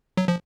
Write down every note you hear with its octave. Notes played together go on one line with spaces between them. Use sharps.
F#3
F3